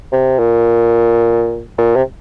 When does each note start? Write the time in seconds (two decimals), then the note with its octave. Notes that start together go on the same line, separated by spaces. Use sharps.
0.12 C3
0.39 A#2
1.78 A#2
1.96 C3